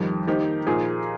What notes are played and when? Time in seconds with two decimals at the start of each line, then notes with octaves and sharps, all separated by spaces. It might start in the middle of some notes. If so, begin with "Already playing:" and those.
Already playing: F2 D#3 G3
0.27 D#3 A#3 D#4 G4 C5
0.67 A#2 F3 A#3 D#4 G#4